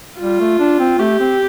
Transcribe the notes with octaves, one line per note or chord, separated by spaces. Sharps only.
G3 F4
A3
D4
C4
A3 G4
C4